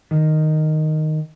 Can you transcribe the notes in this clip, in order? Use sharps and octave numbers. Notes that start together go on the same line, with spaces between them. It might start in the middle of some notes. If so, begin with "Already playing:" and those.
D#3